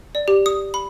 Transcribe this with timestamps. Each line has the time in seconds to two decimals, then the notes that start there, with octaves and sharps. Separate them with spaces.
0.15 D5
0.28 G4
0.46 D#6
0.74 B5